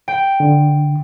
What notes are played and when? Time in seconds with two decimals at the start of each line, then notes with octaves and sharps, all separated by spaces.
0.08 G5
0.40 D3